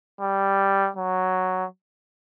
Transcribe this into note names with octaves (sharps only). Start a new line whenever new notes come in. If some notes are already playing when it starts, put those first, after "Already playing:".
G3
F#3